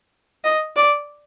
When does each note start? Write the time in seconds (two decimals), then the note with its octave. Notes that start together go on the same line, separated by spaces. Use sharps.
0.44 D#5
0.76 D5